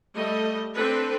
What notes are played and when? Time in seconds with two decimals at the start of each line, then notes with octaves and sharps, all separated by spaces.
0.14 G3 A3 D#5
0.74 C4 D4 A4 B4